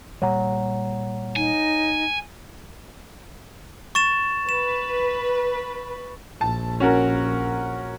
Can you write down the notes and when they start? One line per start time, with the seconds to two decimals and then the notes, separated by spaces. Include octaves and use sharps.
0.22 A#2 G3 C#5 F#5 A#5
1.36 D#4 G#5
3.95 C#6 A6 E7
4.49 B4 E7
6.41 A#1 A5
6.80 C#4 F#4 A#4